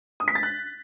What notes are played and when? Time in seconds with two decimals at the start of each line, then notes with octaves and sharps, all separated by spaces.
0.20 D#6
0.28 B6
0.35 A6
0.43 F#6